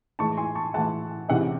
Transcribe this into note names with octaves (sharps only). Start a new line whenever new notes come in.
A2 E3 G#3 A5 C#6
G#5 C6
A5 C#6
A2 E3 G#3 F#5 A5
E2 C3 E3 G#3 C#4 D#5 F#5